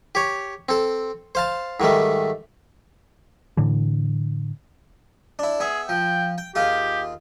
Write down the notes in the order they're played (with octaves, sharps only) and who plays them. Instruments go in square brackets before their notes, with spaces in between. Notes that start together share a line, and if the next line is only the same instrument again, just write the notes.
[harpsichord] G4 C#5
C4 A4
C5 F5 A5
G#2 D#3 G3 A3
[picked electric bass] A2 D3 E3
[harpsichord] D4 E4
[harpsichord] B3 E5 [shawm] G#4
[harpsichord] F3 [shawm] G5
[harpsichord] G5
[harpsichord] D#2 F4 G#4 [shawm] G4